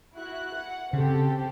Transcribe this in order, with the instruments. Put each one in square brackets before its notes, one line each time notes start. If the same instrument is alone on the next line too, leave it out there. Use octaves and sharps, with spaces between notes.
[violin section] E4 F#4 F#6
F#5
[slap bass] C#3 [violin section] C4 G4 A4